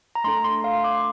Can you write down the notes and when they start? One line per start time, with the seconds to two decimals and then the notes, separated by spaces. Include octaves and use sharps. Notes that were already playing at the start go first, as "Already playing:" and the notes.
0.15 A#5
0.24 A3 D4 A4 C6
0.44 C6
0.64 F5
0.84 D6